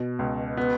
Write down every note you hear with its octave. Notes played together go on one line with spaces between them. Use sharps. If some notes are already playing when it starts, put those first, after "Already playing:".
Already playing: B2
C#2
B3